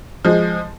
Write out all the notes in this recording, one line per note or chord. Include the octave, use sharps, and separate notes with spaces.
F3 G#3